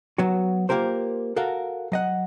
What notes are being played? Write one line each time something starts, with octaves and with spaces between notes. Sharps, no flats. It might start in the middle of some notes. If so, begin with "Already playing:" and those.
F#3 B3 F#4
A#3 F4 G4 A#4 C5
F#4 A4 A#4 F5
F#3 D#5 F#5